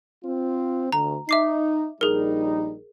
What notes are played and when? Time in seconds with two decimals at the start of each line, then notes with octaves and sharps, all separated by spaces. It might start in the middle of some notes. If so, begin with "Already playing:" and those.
0.24 C4 F4
0.92 D2 A#5
1.29 D#4 E5 D6 C7
2.01 A#1 G3 D#4 G#4 A#4